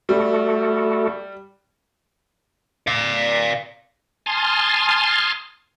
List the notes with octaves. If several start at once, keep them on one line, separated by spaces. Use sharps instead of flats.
G3 A3 F#4 A4
D5 F5
G#5 A5 C6 D#6 F6